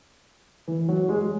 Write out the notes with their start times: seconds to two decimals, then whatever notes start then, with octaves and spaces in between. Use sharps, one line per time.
0.68 E3
0.89 F#3
1.09 G#3